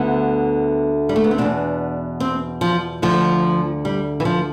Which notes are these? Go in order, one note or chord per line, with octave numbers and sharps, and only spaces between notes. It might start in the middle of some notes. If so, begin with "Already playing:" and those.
Already playing: D2 D3 B3
G3
A3
B3
C4
E2 B2 D4
C4
F3
D2 D3 F3
G3
E3
F3